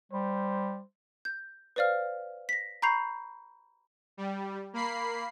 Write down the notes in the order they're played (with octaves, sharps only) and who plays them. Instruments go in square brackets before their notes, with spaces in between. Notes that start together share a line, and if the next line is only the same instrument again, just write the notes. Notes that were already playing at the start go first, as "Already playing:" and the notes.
[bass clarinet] G3 [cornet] C5
[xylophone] G6
B4 C5 D5 F5 F6
A#6 B6
A#5 B5 C#6 G6 C7 F7
[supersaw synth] G3
A#3 B5 C7